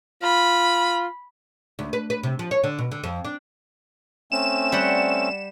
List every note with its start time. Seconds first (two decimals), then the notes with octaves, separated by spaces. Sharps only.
0.23 F4 B5
1.79 D2
1.93 B4
2.10 B4
2.23 C3
2.39 F3
2.51 C#5
2.64 D3
2.79 B2
2.92 D3
3.04 F2
3.25 D4
4.32 A3 C4 C#4 E7
4.72 G3 F#5